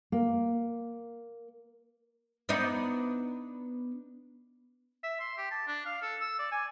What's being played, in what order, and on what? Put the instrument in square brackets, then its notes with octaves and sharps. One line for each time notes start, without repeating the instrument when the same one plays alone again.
[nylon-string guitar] A#3
[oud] B3 D4 D#4
[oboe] E5
C6
G4
A5
D4
F5
A4
E6
D5
G#5